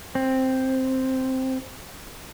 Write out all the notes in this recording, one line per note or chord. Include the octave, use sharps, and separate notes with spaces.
C4